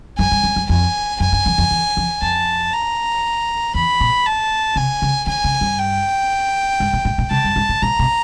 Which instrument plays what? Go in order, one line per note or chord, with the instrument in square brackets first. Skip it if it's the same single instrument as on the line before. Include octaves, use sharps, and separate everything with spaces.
[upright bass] F#2 [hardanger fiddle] G#5
[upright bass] G2
F#2
F#2
[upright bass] F2 [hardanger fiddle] G#5
[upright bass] F#2 [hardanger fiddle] G#5
[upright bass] G2
F2
F2
E2
F2
[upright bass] F2 [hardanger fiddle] A5
[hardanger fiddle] A#5
[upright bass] E2 [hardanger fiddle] B5
[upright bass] A#2
[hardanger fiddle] A5
[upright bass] C3 [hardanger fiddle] G#5
[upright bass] C#3
[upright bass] D3 [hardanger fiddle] G#5
[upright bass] C#3
G2
[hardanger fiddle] G5
[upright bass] G#2
A#2
A2
A#2
[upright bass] C3 [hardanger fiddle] A5
[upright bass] G2
G#2
A2
[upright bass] A#2 [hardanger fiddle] A#5
[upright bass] B2